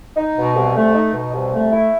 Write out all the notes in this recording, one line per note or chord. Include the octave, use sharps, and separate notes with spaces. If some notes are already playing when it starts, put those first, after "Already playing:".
D#4
B2
C2
A3
D#4
B2
C2
A3
E4